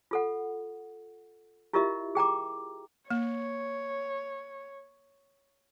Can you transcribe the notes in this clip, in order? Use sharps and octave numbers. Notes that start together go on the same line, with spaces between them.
F4 A4 F#5
E4 F4 G4 A#4 D#5 E5
G#4 G5 A#5 D6
A#3 C#5